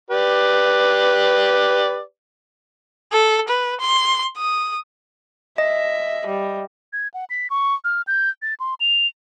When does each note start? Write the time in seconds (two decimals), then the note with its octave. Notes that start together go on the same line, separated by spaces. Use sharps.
0.11 G4 B4 D5
3.12 A4
3.49 B4
3.81 C6
4.38 D#6
5.58 D#5 E5
6.27 G3
6.93 G#6
7.14 F#5
7.30 B6
7.50 C#6
7.84 F6
8.07 G6
8.42 A6
8.60 C6
8.80 F7